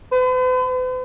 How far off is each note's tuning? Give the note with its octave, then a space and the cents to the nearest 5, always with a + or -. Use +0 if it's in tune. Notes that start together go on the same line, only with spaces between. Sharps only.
B4 +45